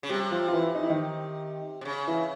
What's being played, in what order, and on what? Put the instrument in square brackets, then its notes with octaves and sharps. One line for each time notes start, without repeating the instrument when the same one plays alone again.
[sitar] C#3
[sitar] C3 [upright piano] G3 G4
[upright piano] F3 F4
F4
E3 E4
D#4
E4
D#3 D#4
[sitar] C3
C#3
[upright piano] E3 E4